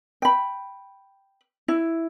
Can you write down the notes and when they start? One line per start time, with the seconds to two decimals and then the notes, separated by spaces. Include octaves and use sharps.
0.22 G5 B5
1.68 E4